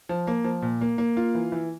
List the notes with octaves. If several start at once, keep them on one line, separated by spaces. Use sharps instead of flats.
F3
A#3
F3
A#2
A#3
A#3
F4
E3
E3